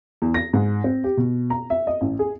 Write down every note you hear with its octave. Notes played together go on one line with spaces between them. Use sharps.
E2
A#6
G#2
C4
G4
B2
A#5
E5
D#5
A1
G#4